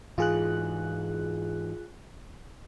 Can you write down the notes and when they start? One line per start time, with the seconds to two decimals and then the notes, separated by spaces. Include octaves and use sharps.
0.18 G#2 E3 F4 G#4 F#6